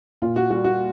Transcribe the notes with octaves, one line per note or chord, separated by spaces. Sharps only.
A#2 F4
F#4
G3 F#4
F#4